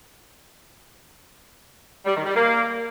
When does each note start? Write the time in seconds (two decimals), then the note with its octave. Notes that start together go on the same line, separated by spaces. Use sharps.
2.05 G3
2.15 D#3
2.25 G3
2.35 A#3